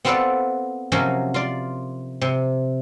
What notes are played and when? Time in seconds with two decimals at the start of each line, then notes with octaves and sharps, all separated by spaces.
0.05 B3 C4 F4 A4 B4 D5
0.92 C3 F3 F#3 A#3 C#4
1.34 F4 D5
2.21 C3